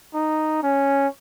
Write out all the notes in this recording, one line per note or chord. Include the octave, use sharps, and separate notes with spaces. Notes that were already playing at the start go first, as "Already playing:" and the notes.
D#4
C#4